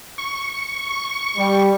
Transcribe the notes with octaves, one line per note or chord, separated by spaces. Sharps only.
C#6
G3